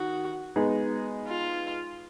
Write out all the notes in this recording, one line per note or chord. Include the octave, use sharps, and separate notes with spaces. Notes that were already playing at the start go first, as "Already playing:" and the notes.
Already playing: D#3 F#4
G#3 B3 D#4 G#4
F4